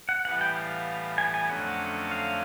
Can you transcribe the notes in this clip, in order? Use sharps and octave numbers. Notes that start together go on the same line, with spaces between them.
F#5
A2 E3 G3 B3 F#5
G5
F5
G#5
G#5
F2 D3 F#3 A3 C#4 F#5
F5